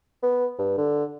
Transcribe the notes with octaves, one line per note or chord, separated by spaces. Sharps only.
B3
G2
D3